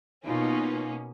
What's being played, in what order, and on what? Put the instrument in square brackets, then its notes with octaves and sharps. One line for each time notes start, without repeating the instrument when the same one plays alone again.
[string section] B2 A#3 C#4 [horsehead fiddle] D#4 F4